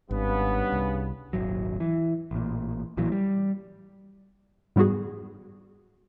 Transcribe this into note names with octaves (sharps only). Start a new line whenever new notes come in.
G#1 G2 C#3 B3
C2
D#1 G#1 F#3
E3
A1 A#2
A1 A#2 E3 F#3
G3
G#2 G3 B3 F#4 G#4